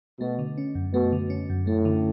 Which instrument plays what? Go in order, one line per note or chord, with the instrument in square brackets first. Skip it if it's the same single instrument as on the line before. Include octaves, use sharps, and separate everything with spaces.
[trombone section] B2 [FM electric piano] A3
[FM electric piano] D3
C#4
F#2
[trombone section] B2 [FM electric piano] A3
[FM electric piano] D3
C#4
F#2
[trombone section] A2 [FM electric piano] A3
[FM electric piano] D3